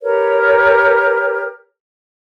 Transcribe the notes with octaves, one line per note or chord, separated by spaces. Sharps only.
G4 A#4 B4 C#5